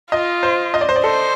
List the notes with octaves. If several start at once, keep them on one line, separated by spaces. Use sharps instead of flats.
F4 D#5
C5
D#5
D5
C5
D5
A4 C5